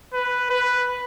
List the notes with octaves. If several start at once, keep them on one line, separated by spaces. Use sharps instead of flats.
B4
B4